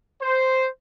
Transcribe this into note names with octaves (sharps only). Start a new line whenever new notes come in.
C5